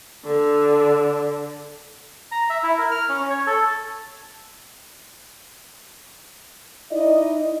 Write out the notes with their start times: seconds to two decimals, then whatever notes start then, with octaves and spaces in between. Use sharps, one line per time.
0.25 D3
2.32 A#5
2.50 E5
2.63 E4
2.78 A#4
2.91 F6
3.09 C#4
3.30 C#5
3.47 A4
6.92 D#4 E4 D5 D#5